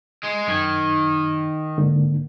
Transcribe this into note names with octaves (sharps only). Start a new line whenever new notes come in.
G#3
F#2 D#3 G#6
G#2 D3 A#3